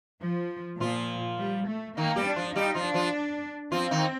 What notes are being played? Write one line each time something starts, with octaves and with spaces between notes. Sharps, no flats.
F3
A#2 F3 F4
G3
A3
D#3 A#3 D#4
G3 G4
D4
F3 F4
G3 D#4 G4
F3 F4
D4
F3 F4
F3 C4 F4
D#3 D#4